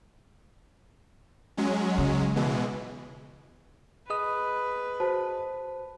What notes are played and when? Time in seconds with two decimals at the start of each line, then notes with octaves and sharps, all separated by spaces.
1.57 F#3 G#3 C#4
1.98 C#3
2.36 B2 E3 G#3
4.10 G#4 B4 D#5 D#6
5.00 F#4 C5 A5